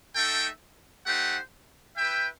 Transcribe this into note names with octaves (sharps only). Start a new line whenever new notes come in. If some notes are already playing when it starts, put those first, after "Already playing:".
A3 D#4 A4 E5 G5
A3 D#4 G4 C5 F#5
E4 B4 E5 G5